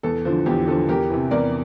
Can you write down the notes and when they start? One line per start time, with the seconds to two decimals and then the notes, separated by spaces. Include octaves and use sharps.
0.03 E2 A4
0.25 D3 F3
0.46 E2 G4
0.67 D3 F3 A4
0.88 E2 G4 A#4
1.10 C3 E3
1.31 E2 A#4 D5